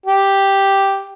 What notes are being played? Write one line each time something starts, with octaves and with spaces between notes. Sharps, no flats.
G4